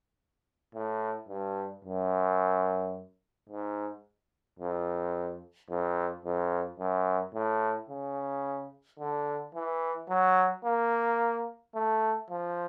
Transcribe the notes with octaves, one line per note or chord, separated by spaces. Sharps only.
A2
G2
F#2
G#2
F2
F2
F2
F#2
A2
C#3
D3
E3
F#3
A#3
A3
F3